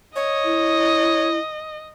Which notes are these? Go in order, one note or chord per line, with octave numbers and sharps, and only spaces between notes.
C#5 D#5
E4